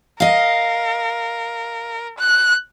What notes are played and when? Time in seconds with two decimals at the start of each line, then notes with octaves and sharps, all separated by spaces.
0.20 A#4 D#5 F5
2.18 F#6